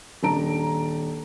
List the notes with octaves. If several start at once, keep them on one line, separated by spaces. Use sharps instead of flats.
D#1 D4 A5 A#5 D7